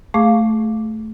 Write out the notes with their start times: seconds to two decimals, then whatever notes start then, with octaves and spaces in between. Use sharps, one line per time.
0.14 A3 G#4 F5 C#6 D6